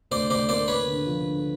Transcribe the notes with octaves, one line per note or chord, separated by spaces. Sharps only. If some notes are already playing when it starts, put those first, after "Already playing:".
D2 C5 D5
D2 C5 D5
A#3 C5 D5
A#3 B4 C#5
D3
F3
D3